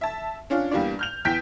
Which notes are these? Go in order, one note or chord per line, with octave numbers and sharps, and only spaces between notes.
E5 A5
C#4 D4 F4
E2 G3 A#3 D4 D5
F6 G6 F7
E2 G5 G6 B6